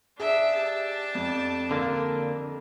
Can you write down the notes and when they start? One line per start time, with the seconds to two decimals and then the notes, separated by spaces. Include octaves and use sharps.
0.20 D4 G#4 E5
0.53 G4 A5
1.15 F2
1.71 D3 A#3